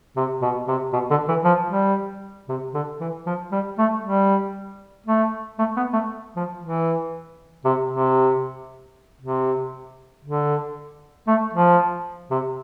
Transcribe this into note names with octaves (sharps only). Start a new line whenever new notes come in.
C3
B2
C3
B2
D3
E3
F3
G3
C3
D3
E3
F3
G3
A3
G3
A3
A3
B3
A3
F3
E3
C3
C3
C3
D3
A3
F3
C3